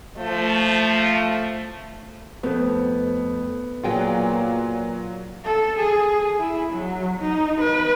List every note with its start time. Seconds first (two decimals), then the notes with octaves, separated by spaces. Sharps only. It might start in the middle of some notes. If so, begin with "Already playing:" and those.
0.18 F3 A3
2.43 F2 A3 B3 C4
3.83 A#2 F#3 F4 G#4 G5 G#5
5.44 A4
5.79 G#4
6.40 E4
6.73 F#3
7.20 D#4
7.61 B4